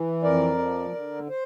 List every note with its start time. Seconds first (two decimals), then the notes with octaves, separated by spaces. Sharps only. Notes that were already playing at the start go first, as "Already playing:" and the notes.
Already playing: E3
0.23 F2 A#4 D5
0.58 F3
0.94 D3
1.29 C5